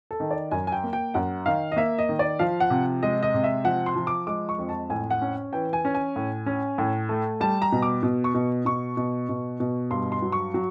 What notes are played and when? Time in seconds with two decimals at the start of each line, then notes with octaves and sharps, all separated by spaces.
0.11 A4
0.20 D#3
0.31 D5
0.51 F#2 G#5
0.67 G#5
0.72 G5
0.84 A#3
0.93 G5
1.14 F#2 F#5
1.46 D#3 F5
1.72 D#5
1.76 A#3 E5
1.98 D#5
2.09 D#3
2.19 D5
2.39 F3 F5
2.60 F#5
2.70 C3
3.03 G#3 D#5
3.23 D#5
3.34 C3
3.44 E5
3.64 F3 F#5
3.86 C6
3.96 F3
4.07 D6
4.27 G#3 D6
4.49 C#6
4.58 F2
4.69 A5
4.90 A2 G#5
5.10 F#5
5.22 C#4
5.53 E3 G5
5.73 G#5
5.85 C#4
5.94 G#5
6.16 A2
6.46 C#4
6.78 A2
7.09 A3
7.40 G3 A5
7.62 A#5
7.72 B2
7.82 D6
8.03 B2
8.24 C#6
8.34 B2
8.65 B2 C#6
8.97 B2
9.29 B2
9.60 B2
9.91 G2 C6
10.12 C6
10.22 F#3
10.32 C#6
10.54 F#3